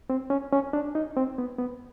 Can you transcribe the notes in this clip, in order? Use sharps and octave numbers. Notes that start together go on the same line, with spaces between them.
C4
C#4
C#4
D4
D#4
C4
B3
B3